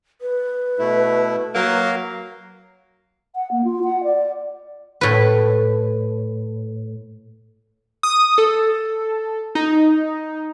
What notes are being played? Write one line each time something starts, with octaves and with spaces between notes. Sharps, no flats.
B4
B2 A3 E4
F#3 A#3 A#4 F5
F#5
A#3
F4
F#5
D5
A2 B4
D#6
A4
D#4